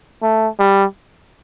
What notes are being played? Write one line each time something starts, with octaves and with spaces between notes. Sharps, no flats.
A3
G3